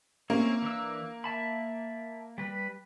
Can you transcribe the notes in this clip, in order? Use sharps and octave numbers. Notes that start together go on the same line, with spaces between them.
A#3 C4 C#4 E4
E3 D4 E6
E5 A5 B5
G3 B4